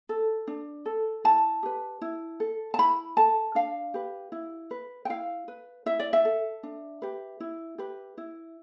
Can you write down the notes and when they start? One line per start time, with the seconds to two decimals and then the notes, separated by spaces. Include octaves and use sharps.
0.09 A4
0.47 D4
0.86 A4
1.24 E4 A5
1.63 G4 B4
2.01 E4
2.40 A4
2.74 A5
2.78 E4 B5
3.17 A4 A5
3.55 D4 F5
3.94 G4 B4
4.32 E4
4.71 B4
5.05 G5
5.09 E4 F5
5.48 B4
5.86 E4 E5
6.00 D5
6.13 E5
6.25 A4
6.63 D4
7.02 G4 B4
7.40 E4
7.78 G4 B4
8.18 E4